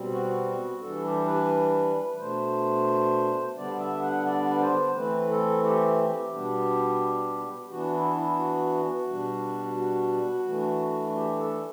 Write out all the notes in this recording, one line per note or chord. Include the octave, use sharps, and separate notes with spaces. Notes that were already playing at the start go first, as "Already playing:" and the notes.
Already playing: B2 G3 C4
F#4
E3 G3 D4 A4
G4
B4
B2 A3 D4 C5
D3 G3 B3 D4 D5
E5
F#5
D5
B4
C5
E3 A3 C4 B4
A4
G4
B2 G3 B3 D4
G4
E3 B3 D4 F#4
E4
E4
F#4
B2 G3 D4
F#4
E3 A3 D4
G4
A4